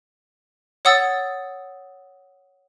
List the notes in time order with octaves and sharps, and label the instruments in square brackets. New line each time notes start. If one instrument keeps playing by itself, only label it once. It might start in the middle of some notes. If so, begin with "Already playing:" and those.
[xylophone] C#5 F#5 D#6 E6 A6